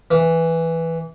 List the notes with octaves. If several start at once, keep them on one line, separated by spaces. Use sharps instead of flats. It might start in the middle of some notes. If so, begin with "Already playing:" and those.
E3